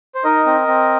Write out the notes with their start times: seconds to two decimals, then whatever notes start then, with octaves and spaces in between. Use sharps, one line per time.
0.15 C5
0.24 D#4 A#4 D#5
0.46 C4
0.67 C4